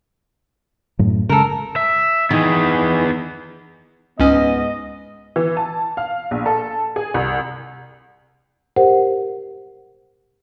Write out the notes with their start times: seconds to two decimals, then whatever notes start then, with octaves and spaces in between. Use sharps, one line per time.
0.99 F#2 A2
1.29 C#3 G#3 A4 A#4
1.76 E5
2.30 D#3 E3 B3 G#4
4.20 C#2 G#2 B3 C#4 D#5
5.36 E3
5.57 A5
5.97 F5
6.31 A#1
6.46 A4
6.96 G#4
7.14 C2
8.76 G4 A#4 C5 F#5